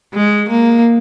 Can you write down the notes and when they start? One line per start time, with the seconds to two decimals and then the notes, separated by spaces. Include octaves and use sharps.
0.13 G#3
0.49 A#3